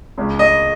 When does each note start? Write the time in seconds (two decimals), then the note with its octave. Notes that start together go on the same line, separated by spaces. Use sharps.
0.17 C#2 C#3 G#3
0.39 D#5